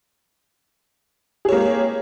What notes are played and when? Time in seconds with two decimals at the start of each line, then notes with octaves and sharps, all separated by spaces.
1.45 G#4
1.48 C#5
1.52 A#3
1.56 G4